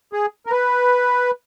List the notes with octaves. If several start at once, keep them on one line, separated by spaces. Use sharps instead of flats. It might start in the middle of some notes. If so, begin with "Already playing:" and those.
G#4
A#4
B4